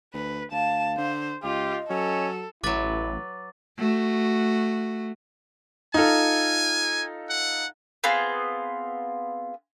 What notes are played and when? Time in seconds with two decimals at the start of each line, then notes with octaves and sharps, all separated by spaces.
0.14 D2 B4
0.51 D2 F5 A5
0.98 D3 C5
1.43 C#2 F4 G4 D#5
1.90 F#3 C#4 A4
2.64 A1 F#3 E4 B4 D6 A6
3.77 A3 F#4
5.94 D#4 F4 A4 G#5
7.30 F#5
8.04 B3 C4 F4 G#4